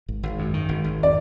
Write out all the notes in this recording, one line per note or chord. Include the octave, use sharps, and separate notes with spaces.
G#1
G#1
F#2
D#3
G#1
G#1
D5